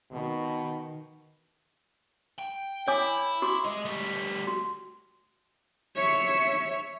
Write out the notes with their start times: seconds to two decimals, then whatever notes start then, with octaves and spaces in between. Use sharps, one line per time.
0.11 B2 D#3
2.38 G5
2.88 E4 C#5 G#5 D6
3.42 F#4 C#6 D6
3.65 G#3 D#5
3.85 G3 A3
4.47 F#4
5.96 C#5 E5